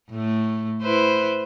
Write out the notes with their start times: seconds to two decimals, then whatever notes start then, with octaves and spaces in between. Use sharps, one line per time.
0.11 A2 A3
0.83 E4 B4 C5